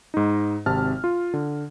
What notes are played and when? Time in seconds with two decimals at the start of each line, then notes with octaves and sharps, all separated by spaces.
0.14 G#2 D#4
0.66 G#1 C3 A5 F6
1.04 F4
1.34 D3